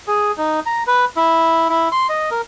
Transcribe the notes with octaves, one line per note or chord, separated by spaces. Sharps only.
G#4
D#4
A#5
B4
E4
E4
C6
D#5
A#4